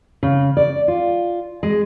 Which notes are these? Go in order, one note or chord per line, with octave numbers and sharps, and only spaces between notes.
C#3
D5
F4
G#3